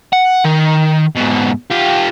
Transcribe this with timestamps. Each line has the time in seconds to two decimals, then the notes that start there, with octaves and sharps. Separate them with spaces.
0.13 F#5
0.44 D#3
1.17 G#2 B2
1.71 F4 G4